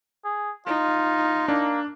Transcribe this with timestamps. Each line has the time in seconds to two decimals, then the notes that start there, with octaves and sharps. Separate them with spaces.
0.25 G#4
0.67 D#4 F4
1.48 A#3 D4